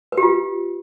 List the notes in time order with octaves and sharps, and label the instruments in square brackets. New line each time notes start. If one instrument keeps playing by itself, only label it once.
[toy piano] B4
G4
F4